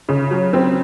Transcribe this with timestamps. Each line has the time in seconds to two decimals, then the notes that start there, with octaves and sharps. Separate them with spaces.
0.09 C#3
0.31 F#3
0.53 C4